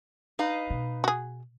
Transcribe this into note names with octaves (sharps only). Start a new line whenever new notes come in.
D#4 B4 F5
B2
F#4 G#4